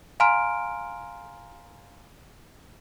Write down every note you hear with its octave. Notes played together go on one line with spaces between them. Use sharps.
F5 G#5 A#5 C6 F6 D7